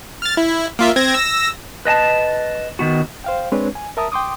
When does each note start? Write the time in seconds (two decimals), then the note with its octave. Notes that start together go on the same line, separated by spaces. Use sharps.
0.22 F6 A6
0.37 E4
0.79 A#3 F4 E5
0.96 C4 G#6 A#6
1.14 E6 A#6
1.85 B4 D#5 G#5 A5
2.79 D#3 B3 F#4
3.24 C5 F5 G5
3.52 G#3 C4 D4 B4 C#5
3.75 G#5
3.97 A#4 E5 A5 A#5 D#6
4.12 G5 C6 D6 D#6